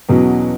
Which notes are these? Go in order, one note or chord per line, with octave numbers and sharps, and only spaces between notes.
E2 B2 F#3 C#4